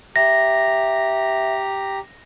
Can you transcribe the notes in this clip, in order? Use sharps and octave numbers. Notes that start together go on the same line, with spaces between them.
G4 E5 A#5 A#6